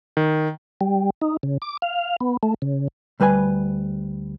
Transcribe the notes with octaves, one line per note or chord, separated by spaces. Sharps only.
D#3
G3
D#4
C#3
D6
F5
B3
A3
C#3
D2 G3 B4 C5 G#5